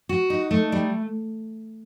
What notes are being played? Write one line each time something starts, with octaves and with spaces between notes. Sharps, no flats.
F#4
D#4
A3
G3